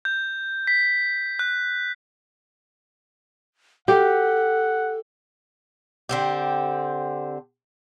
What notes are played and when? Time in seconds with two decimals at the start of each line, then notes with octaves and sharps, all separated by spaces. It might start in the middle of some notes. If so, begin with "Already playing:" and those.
0.05 G6
0.67 B6
1.39 F#6
3.88 G4 A4 F#5
6.09 D3 C4 G4